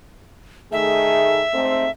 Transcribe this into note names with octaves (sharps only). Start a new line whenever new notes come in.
D#3 A3 G#4 E5
G#2 A3 C4